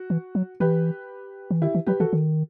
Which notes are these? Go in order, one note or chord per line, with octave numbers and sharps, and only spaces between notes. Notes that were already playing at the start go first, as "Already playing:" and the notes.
Already playing: F#4
E3
F#3
E3 G4 B4
E3
D#3 E4 G4
E3
F#3 G4 B4
E3 F#4 A4
D#3